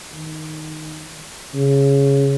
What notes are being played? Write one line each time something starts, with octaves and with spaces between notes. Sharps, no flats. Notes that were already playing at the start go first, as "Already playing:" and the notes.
D#3
C#3